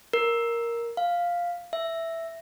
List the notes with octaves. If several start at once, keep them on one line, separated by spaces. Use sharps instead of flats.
A#4
F5
E5